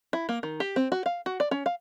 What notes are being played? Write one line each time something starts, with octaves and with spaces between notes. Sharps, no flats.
E4
A#3
D#3
G4
C4
F#4
F5
F#4
D5
C#4
F5